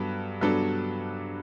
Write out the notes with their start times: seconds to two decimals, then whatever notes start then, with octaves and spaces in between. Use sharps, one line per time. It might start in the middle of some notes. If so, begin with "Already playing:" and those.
Already playing: G2 F#3 B3 A4
0.41 G2 F#3 B3 D4 A4